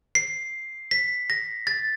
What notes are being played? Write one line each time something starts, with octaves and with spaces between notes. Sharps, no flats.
C7
B6
A#6
A6